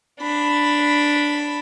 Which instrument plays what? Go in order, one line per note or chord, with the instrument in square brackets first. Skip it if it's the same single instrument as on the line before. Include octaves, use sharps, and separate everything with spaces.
[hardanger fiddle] D4 B5